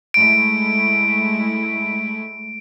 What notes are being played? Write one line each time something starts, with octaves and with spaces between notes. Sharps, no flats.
G#3 A3 E4 D7